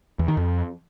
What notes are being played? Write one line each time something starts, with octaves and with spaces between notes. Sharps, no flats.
E2
D#3
F2